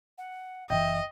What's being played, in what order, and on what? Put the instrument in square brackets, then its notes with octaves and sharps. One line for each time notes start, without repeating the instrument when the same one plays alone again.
[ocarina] F#5
[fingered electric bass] F#1 B2 E3 [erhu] D#5 [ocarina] E5 [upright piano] G5